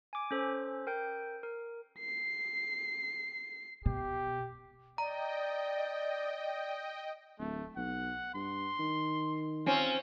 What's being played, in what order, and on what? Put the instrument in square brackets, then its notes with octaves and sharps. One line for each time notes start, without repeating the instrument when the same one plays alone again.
[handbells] G#5 D6
C#4 A4 C5
A#4 G5 G6
A#4
[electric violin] C7
[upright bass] B2 [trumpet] G4
[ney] D5 [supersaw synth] D#5 G5 [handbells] A#5
[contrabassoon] D1 [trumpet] A3
[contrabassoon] B1 [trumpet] F#5
[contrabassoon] G2 [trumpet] C6
[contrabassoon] D#3
[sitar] C4 C#4 [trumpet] F4